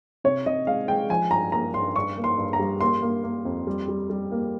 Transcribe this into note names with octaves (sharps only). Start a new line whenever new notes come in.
C3 C#5
C3 D#5
G#3 F5
G#3 G5
F3 G#5
G2 A#5
A#3 A#5
G2 C6
G2 C#6
A#3
C6
G2
A#5
G3
A#3 C6
A#3
A#3
F2
G3
G3
G3
A#3